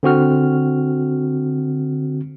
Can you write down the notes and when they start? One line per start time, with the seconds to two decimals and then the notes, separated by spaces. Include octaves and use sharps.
0.03 D3 C4 F#4 F6